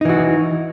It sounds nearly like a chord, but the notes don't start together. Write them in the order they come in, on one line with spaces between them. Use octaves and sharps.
D#4 E3 F#4